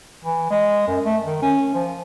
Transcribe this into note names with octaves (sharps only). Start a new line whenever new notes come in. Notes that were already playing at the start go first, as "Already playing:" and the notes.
E3
G#3
F#2
A3
D#3
C#4
F3